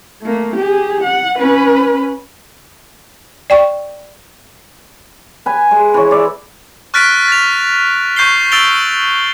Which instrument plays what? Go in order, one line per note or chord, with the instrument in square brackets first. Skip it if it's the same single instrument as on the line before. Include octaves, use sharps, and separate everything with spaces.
[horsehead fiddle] A3 A#3
G4 G#4
F#5
C#4 B4
[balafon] D5 G5 C#6
[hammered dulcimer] B4 G#5
G#3
E3 C#5
D5 E5
[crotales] C#6 F6 F#6 A6 B6 D7
A6 F7
C#6 G6 B6 C7 G7
E6 A6 D7 F7 G7